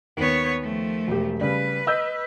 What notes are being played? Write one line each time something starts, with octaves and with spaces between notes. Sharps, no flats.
D#2 B3 C#5
F3 A3
E1 G4
C#3 G3 B4
D#5 E6 G6